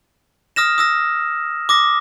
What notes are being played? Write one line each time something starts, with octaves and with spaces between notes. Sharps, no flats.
D#6 F6 A#6 E7
D#6 E6 A#6
D6 D#6 A#6